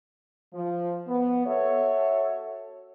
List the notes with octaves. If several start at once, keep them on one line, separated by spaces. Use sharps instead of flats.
F3
B3
F#4 A4 C#5 E5